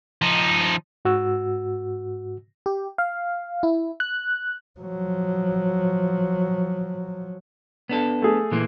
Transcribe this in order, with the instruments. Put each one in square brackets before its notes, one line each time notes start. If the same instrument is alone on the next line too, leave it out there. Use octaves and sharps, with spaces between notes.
[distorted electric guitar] F3 D#4
[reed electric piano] G#2 F#4 E6
[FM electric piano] G4
F5
E4
F#6
[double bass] F3 F#3
[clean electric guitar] B3 D4 A4
[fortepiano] A3 G#4
[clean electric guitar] A#2 E3 A#3